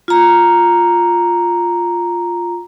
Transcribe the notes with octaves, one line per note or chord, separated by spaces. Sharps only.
F4 A#5